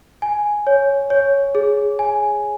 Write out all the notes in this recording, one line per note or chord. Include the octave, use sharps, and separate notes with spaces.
G#5
C#5
C#5
G#4
G#5